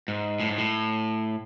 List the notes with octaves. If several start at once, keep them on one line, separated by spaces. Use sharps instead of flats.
G#2
A2
G#2
A2